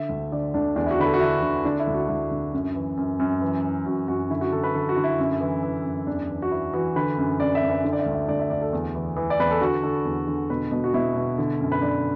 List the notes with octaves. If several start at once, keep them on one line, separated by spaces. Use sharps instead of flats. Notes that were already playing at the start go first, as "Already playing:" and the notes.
Already playing: D3 E5
D2
D3 D5
D2 D4
E2 D4
E4
F#4
D3 B4
A4
F#4
D3 E4
D3
D3 D4
E4
D2
F#4
D2 E4
D2
F#2
E3
F#2
F#2
E3
E3
F#2 F#4
F#2 F#4
D3 E4
F#4
D3 A4
B4
D3 A4
F#4
D3
E4
F#2
E3
E3
F#2
E2 D4
E3
F#4
E3 E4
E3 F#4
D3 B4
F#2
F#2 D5
E5
F#2
B4
D3
D5
E5
D2
E5
D2 D5
E5
D2 D5
A4
E2
E3
E3
D5
E2 B4
A4
D3 F#4
D3 A4
E2
D3
B2 B4
B2
F#4
B2 E4
B2
D3
F#2
B4
D3 D5